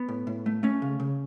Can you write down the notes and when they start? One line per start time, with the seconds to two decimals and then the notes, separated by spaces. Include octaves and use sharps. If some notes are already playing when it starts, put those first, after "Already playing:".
Already playing: B3
0.08 A2
0.27 A2
0.46 A3
0.63 A3 C#4
0.82 C#3
1.00 C#3